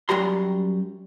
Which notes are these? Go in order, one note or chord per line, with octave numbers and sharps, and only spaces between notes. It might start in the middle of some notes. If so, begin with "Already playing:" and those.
F#2 G3 F#4 G4 A#5 C6